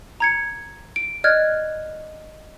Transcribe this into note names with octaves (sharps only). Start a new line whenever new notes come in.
A#5 G#6 C#7
D7
D5 D#5 F6 F#6 G#6